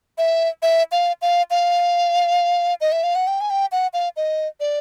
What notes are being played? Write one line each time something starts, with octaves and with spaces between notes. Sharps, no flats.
E5
E5
F5
F5
F5
D#5
E5
F5
F#5
G5
G#5
G5
F#5
F5
D#5
D5